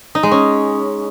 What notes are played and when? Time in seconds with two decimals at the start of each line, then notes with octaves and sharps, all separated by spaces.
0.15 D#4
0.23 G#3
0.31 C#4